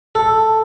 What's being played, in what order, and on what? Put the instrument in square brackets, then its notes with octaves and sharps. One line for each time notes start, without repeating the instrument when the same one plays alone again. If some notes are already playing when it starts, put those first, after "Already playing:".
[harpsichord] A4